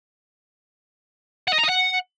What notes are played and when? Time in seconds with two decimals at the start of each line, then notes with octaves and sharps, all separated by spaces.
1.48 F#5
1.53 D#5
1.59 A#5
1.64 D#5
1.69 F#5